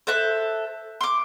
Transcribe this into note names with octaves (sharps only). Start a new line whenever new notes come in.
A4 C5 E5 F#6
C6 D6